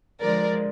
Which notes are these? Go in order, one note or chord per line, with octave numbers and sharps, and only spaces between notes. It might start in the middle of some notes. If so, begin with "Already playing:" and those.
D3 F3 G#3 A#4 D5